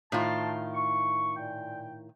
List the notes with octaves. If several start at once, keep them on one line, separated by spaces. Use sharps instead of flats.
A2 D#3 F4 A5
C#6
A#2 G5